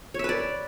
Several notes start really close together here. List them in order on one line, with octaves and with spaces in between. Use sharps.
C#5 E5 B4 D5